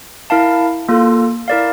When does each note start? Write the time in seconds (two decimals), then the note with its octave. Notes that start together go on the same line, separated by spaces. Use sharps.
0.30 E4 A#4 F5 A5
0.89 A#3 F4 A4
1.48 E4 A#4 D5 F5